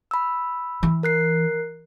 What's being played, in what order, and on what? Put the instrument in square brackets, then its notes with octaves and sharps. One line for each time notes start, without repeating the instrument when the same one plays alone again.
[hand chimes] B5 E6
[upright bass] E3
[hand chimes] A#4 F#6 C7